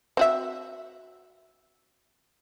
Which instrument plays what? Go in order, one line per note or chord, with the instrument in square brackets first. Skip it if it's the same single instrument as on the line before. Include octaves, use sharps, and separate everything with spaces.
[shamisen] C4 F#4 E5